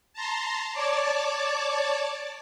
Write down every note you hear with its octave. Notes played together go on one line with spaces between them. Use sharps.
A5 A#5 C6
C#5 D5 A5 D6